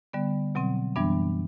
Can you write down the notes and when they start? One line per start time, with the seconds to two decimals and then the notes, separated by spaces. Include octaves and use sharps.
0.13 D3 G3 B3
0.55 B2 F#3 C4
0.96 F#2 E3 G3 B3 D4